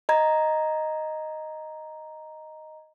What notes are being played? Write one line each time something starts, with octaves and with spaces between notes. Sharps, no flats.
D#5 A#5 G#6